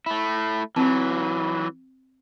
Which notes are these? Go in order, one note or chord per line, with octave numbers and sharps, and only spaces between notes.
A3 E4
E3 F#3 C4